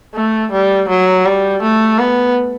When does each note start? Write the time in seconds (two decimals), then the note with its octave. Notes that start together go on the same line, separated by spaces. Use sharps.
0.15 A3
0.52 G3
0.89 F#3
1.26 G3
1.62 A3
1.99 B3